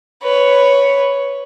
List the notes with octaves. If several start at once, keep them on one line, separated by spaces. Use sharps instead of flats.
B4 C#5